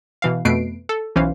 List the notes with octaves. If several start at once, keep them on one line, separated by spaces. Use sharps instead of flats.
B2 E3 F5
F2 B2 A3 B4 C7 D7
A4
B1 E3 C#4 E4 C5 F5